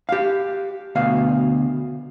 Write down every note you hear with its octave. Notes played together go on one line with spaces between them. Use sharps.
G4 F5
D2 B2 F5